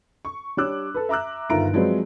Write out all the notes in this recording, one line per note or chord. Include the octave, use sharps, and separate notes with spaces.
C#6
G3 D4 C#5 D6 E6 F#6
A4 B4
E5 A#5 D6 E6 F#6
G1 D#3 F4 E5 A#5 D7
F3 F#3 G#3 C4 B4 D5